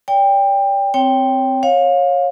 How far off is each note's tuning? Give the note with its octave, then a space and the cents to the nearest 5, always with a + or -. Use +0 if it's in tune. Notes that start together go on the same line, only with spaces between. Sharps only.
D5 -40 G5 +20
C4 +0 C#5 +0 G5 +0
C#5 -15 F5 +25